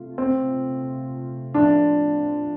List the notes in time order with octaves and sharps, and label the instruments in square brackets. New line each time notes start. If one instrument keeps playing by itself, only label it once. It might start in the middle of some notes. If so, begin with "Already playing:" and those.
Already playing: [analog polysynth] C3 A3 F4
[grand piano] C4
[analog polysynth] A2 F3 A3 C4 F4 [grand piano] D4